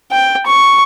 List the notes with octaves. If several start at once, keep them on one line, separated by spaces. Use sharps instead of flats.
G5
C#6